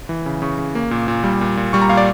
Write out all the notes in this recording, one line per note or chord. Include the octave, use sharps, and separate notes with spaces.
E3
C#3
C#3 C#6
C#3
A#3
A#2
A#2
G3
A#2
A#2
G3 C#6
A#5
A#2 F5
D5